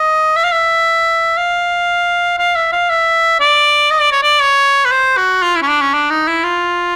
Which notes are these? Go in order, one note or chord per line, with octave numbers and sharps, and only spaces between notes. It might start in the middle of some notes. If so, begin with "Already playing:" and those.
Already playing: D#5
E5
F5
E5
F5
F5
E5
F5
E5
D5
D#5
D5
C#5
D5
C#5
B4
C5
F#4
F4
E4
C#4
D4
C#4
D4
D#4
E4
F4